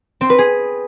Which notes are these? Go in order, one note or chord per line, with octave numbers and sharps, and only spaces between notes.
C4
B4
G#4